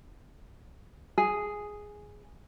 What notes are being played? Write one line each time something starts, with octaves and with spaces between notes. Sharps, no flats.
G#4